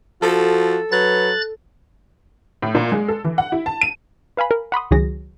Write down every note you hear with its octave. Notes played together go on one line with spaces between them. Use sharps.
F3 F#4 A4
F#3 B4 F#6 A6
A2
A#2
G#3
A4
E3
F#5
E4
A5
D#7
B4 F5 G#5 B5
A#4
F#5 B5 C6 D#6
C#2 D#3 F#3 F#4 G#4 A#6